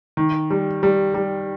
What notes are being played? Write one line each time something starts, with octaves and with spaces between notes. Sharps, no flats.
D#3
G3
G3
G3